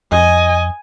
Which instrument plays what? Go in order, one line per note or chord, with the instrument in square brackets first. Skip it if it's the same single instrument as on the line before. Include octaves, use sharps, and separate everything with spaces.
[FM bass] F2 [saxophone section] D#5 [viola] G#5